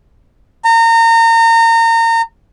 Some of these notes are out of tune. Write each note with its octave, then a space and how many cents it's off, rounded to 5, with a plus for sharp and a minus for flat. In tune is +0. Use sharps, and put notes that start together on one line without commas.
A#5 -30